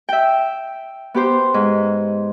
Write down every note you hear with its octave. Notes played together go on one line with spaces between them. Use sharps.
E5 G5
B3 G4 C5
G#2